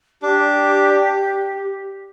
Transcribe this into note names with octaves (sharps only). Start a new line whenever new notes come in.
D4 G4